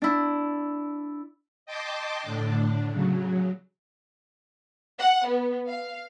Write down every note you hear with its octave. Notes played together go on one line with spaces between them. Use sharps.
D4 E4
D#5 G5 A5 C6 D6
A2 D3 D4
C#3 F#3
F#5
B3
F5